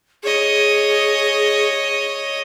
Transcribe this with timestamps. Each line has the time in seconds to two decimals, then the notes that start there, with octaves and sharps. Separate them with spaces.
0.23 G#4 C#5 D#5